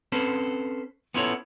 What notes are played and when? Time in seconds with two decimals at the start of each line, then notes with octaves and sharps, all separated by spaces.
0.12 C4 C#4 A4 B4 C5
1.14 B3 C#4 E4 F4 A4 C#5